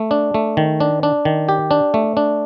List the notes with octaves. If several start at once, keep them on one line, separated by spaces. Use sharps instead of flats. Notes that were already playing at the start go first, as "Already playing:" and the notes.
Already playing: A3
D4
A3
D#3
D4
D4
D#3
G4
D4
A3
D4